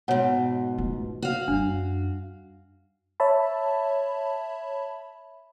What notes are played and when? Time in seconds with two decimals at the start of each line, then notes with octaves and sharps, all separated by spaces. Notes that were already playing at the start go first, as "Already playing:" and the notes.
0.08 G#2 B2 C#5 F#5
0.78 A3 F4
1.22 F#4 F5
1.48 F#2 G3 D4
3.20 C#5 E5 A5 B5